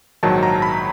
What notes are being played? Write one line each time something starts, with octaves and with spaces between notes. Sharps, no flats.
A#1 G#2 D#3 F#3 A5
A#5
B5